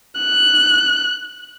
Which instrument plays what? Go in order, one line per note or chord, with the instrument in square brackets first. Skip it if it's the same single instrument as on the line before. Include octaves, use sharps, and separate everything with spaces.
[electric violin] F#6